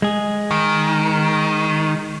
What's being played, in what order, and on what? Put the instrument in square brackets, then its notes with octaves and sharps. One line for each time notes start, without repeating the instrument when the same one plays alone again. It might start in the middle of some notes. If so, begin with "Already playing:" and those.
[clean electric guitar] G#3 G#4
[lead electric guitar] D#3